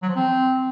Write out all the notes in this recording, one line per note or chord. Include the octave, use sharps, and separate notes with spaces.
F#3
F3
C4